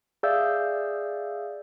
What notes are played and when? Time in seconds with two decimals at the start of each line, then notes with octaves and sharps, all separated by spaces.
0.23 G#4 D5 E5 F5 E6 G6